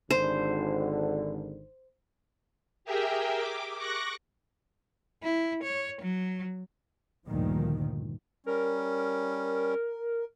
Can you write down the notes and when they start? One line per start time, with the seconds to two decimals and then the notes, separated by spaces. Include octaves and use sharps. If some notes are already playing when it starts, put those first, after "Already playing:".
0.11 G#1 D3 C5
2.84 G4 G#4 A#4 E5 G5
3.35 D6
3.77 C#6 D6 F#6 A#6
5.23 E4
5.63 C#5
6.02 F#3
7.27 D2 G2 A#2 D#3 F3
8.46 G3 C#4 A#4